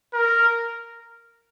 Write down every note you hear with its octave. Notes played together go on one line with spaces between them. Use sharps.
A#4